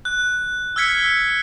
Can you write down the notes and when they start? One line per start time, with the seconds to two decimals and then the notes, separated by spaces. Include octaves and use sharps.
0.05 F#6
0.76 E6 F6 G#6 B6 C#7